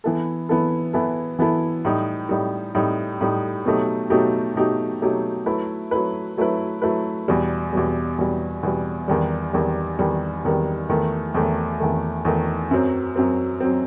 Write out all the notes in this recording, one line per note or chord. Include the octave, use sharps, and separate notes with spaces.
E3 B3 E4 A4
E3 B3 E4 A4
E3 B3 E4 A4
E3 B3 E4 A4
A2 G3 D#4
A2 G3 D#4
A2 G3 D#4
A2 G3 D#4
B2 F#3 A3 D#4 G4
B2 F#3 A3 D#4 G4
B2 F#3 A3 D#4 G4
B2 F#3 A3 D#4 G4
F#3 A3 E4 B4
F#3 A3 E4 B4
F#3 A3 E4 B4
F#3 A3 E4 B4
E2 B2 G3
E2 B2 G3
E2 B2 G3
E2 B2 G3
E2 D#3 G3
E2 D#3 G3
E2 D#3 G3
E2 D#3 G3
E2 D#3 A3
E2 D#3 A3
E2 D#3 A3
E2 D#3 A3
F#2 F#3 C4
F#2 F#3 C4
F#3 C4